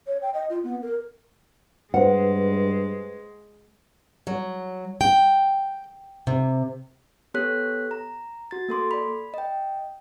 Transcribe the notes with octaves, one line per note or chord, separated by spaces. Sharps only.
C#5
G5
D#5
F4
B3
A#4
G2 G#3 B4 C5 F#5
F#3
G5
C3
B3 G4 A4 C#5 F#6 B6
A#5
F#4 A6
A#3 A4 C6 D6
D5 B5
D#5 G5